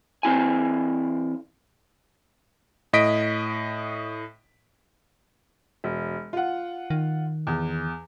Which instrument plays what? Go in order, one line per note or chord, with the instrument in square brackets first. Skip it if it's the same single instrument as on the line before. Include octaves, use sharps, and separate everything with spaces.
[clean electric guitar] E3 C4 E4 G#5
[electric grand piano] A2 D#5 B6 D7
[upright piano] E1
F4 F#5
[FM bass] D#3
[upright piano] E2